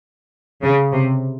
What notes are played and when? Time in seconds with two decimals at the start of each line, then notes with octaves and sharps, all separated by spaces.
0.63 C#3
0.92 C3